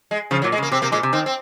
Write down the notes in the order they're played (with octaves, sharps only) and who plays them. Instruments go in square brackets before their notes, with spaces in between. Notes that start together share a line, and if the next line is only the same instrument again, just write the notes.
[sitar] G#3
[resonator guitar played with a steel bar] C#3 [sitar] F3
[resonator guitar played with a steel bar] A#2 [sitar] F#3
[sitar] G#3
[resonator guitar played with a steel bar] C#3
[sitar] A#3
[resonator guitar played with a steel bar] C3 [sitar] C4
[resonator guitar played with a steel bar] C3 [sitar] A#3
[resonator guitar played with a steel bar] A#2 [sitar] G#3
[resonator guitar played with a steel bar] C3
[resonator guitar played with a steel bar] D#3 [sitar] C4
[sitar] C4